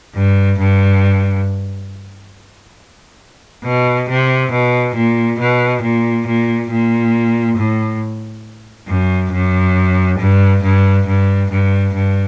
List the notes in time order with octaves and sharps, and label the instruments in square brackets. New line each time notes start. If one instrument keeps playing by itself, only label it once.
[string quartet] G2
G2
B2
C3
B2
A#2
B2
A#2
A#2
A#2
A2
F#2
F#2
G2
G2
G2
G2
G2